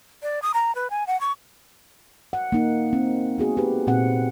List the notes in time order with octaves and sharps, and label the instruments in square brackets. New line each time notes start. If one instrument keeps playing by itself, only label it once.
[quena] D5
D#6
A#5
B4
G#5
F#5
C#6
[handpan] F#5
A#3 D#4
C4
B3 F#4 G#4
G4 B4
A#2 C4 F#5